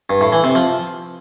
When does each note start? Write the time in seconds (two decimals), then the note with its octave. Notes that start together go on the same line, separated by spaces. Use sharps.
0.10 G2
0.21 A2
0.32 E3
0.44 C3
0.55 F3